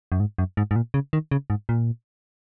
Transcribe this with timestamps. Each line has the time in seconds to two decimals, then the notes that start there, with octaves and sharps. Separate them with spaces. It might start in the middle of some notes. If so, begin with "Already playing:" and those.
0.12 F#2
0.20 G#2
0.38 F#2
0.57 G#2
0.71 G#2
0.76 A#2
0.94 C#3
1.13 D#3
1.31 C#3
1.50 G#2
1.69 A#2